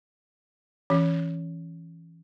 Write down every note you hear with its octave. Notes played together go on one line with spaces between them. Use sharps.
E3 C#4